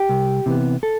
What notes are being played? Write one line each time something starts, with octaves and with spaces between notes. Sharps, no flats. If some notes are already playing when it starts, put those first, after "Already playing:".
Already playing: G4
C2
C3 E3 B3
A4